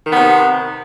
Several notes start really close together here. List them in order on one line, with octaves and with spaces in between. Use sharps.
D#3 B3 C3